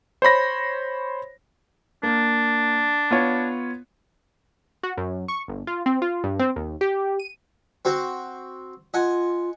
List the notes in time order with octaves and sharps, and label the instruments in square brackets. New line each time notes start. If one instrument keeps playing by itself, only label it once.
[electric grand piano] C5 C#5 B5 A#6
[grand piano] A#3 [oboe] D4
[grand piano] B3 F4 C#5
[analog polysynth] F#4
F#2
C#6
G1
F4
C4
F4
G2
C4
D#2
G4
D#7
[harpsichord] C4 F#4 C5
[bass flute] F4 [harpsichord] D#5 F#5 G#5